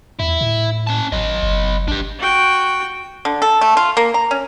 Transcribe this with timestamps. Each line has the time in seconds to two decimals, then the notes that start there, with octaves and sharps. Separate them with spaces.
0.19 E2 E4
0.41 A2
0.87 C#4 A5
1.12 G#1 F#3 D#5
1.43 F#1
1.88 G#1 D4 G4
2.19 F#4 G5
3.25 D3
3.42 A4
3.61 A3
3.77 F4
3.97 A#3
4.14 A#5
4.31 C#4